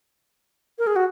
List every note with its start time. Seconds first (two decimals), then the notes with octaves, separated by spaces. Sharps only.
0.79 A#4
0.87 G#4
0.96 F#4